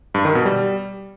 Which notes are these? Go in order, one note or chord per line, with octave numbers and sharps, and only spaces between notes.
G2
D#3
B2
G3